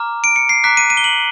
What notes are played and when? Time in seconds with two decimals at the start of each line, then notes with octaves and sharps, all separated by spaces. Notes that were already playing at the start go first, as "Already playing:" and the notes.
Already playing: A#5 D6 F6
0.24 D7
0.36 C#7
0.49 C7
0.64 A#5 D6 F#6 B6
0.77 D#7
0.90 D#7
0.97 G7
1.04 F#7